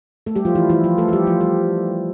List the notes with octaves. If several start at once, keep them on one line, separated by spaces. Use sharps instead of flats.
A3 A4
G3 G4
F3 F4
E3 E4
E3 E4
F3 F4
A3 A4
A4
G3 G4
F3 F4
G3 G4